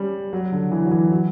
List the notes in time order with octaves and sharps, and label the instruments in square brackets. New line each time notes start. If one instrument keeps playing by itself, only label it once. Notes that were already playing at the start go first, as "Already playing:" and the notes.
Already playing: [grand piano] G3 C#4
F#3
D3
E3
F#3
E3
F#3